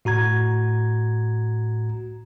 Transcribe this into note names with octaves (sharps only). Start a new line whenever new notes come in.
A2 F#4 A#5 G#6